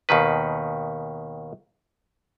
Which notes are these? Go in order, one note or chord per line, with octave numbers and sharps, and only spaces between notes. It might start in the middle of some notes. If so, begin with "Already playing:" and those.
D#2 B2 D#3 B4